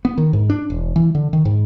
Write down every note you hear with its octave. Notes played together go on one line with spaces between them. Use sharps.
B3
D#3
G#2
D4
E1
E3
D3
D#3
G#2